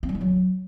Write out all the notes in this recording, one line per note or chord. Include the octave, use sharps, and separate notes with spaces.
C4
G3
E4
F#3